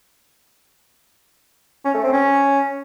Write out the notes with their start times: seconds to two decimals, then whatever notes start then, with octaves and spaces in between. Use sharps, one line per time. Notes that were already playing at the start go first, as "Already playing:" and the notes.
1.85 C#4
1.94 A3
2.03 C4
2.13 C#4